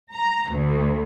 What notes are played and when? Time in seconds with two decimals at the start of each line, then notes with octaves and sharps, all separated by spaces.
0.13 A#5
0.50 D2